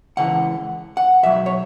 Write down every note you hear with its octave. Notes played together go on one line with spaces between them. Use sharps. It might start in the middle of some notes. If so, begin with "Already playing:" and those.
C#2 C#3 E3 F#5
F#5
B1 B2 F#3 E5
C#5